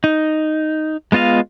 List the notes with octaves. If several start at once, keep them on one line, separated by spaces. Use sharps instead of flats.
D#4
G#3 B3 F4 D#5 F5